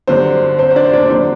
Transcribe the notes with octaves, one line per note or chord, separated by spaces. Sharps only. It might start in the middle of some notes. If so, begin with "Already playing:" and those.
G2 D3 F#3 C4 C5
C4 C5
C5
D4 D5
D4 D5
D5
D3 F#3 C4 C5